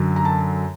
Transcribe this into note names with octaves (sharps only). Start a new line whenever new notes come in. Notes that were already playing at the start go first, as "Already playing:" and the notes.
Already playing: F#2 D3 F#3
A#5
A5